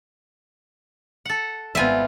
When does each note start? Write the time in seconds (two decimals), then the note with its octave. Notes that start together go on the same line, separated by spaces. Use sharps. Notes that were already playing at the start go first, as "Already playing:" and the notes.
1.25 A4 F#5
1.75 G#1 G3 B3 C4 F4 E5 G#5